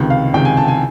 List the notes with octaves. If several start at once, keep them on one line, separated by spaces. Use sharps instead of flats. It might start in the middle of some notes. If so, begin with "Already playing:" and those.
Already playing: C#2 C3 D#3
F5
C#2 C3 D#3 G5
G#5
A5
G#5